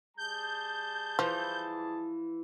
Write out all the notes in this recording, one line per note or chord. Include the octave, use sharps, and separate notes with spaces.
G3 G#4 A5 G6
E3 F3